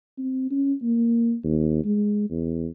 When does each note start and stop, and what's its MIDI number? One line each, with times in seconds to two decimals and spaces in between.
0.18 0.47 60
0.51 0.74 61
0.83 1.35 58
1.44 1.84 39
1.85 2.27 56
2.30 2.67 40